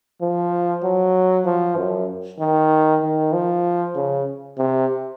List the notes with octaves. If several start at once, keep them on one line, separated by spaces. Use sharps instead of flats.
F3
F#3
F3
F#2
D#3
D#3
F3
C#3
C3